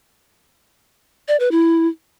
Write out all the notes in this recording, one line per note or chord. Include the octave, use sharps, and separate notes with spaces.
D5
B4
E4